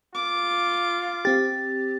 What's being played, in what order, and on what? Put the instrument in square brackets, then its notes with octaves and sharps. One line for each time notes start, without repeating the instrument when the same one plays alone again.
[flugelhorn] F4 [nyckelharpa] D6
[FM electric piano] C4 G4 [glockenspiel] A6